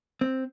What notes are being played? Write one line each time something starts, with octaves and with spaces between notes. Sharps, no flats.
C4